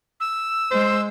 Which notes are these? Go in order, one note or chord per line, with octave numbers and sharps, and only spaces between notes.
E6
G#3 C5